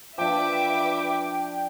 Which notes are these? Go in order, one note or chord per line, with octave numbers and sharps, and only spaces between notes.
F3 D4 B4 E5 G5 D6